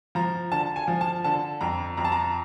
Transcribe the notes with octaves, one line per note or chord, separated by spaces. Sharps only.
F3 A#5
D3 A5
G#5
F3
A5
D3 A5
F2 A#5
F2 A#5
A5
A#5